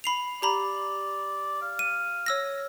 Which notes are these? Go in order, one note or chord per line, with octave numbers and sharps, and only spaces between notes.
B5 C7 F7
G4 D5 A#5 B5
F5
D#7
C#5 E6 A#6